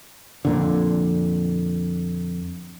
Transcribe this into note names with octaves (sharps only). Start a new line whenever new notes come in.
F2 A#2 D3